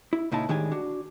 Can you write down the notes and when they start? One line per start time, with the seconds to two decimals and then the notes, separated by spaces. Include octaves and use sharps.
0.13 E4
0.32 C#2 A#2 D#4 E4 A5
0.49 A2 D#3 G#3 D4 G4 G#5
0.71 D4 F#4